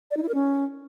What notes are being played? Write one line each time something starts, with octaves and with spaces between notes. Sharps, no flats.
D5
D#4
E4
A#4
C#4